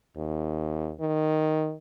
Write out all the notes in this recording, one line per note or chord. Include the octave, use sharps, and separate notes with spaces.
D#2
D#3